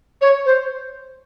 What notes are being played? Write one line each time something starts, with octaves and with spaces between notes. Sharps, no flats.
C#5
C5